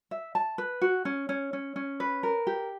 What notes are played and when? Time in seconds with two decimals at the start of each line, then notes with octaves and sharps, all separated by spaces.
0.11 E5
0.35 A5
0.58 B4
0.81 F#4
1.05 C#4
1.29 C#4
1.53 C#4
1.76 C#4
2.00 B4
2.23 A#4
2.47 G4